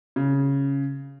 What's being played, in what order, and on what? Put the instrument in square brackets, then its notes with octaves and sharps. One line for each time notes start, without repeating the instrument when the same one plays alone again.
[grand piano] C#3